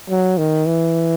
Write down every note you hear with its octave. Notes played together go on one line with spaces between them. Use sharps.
F#3
D#3
E3